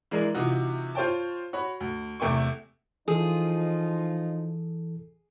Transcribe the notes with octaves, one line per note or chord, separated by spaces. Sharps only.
E3 G#3 D4 G#4 A#4
C3 E3 D#4 F4 F#4
F4 C5 C#5 G5 A5
F#4 C#5 B5
D2
E2 C3 A3 G5 G#5 C#6
E3 F3 D#4 F4 G#4 A4